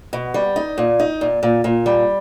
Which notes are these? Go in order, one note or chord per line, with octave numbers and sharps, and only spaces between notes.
B2
G3
D#4
A#2
D#4
A#2
A#2
A#2
G3